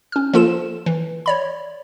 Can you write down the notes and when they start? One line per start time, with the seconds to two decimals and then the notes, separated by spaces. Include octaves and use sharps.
0.12 C#4 F6
0.33 F3 A#3 F4 A4 E7
0.86 E3
1.26 C#5 D5 B5